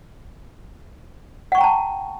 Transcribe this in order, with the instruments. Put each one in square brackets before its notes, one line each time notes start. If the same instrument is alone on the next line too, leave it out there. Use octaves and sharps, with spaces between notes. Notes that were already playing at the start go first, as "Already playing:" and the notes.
[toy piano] F#5
C#6
G5
A#5
A5